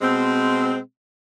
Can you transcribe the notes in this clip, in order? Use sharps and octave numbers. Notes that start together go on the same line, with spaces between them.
B2 G#3 C4